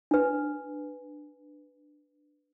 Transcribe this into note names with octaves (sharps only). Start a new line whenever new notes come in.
D4 B4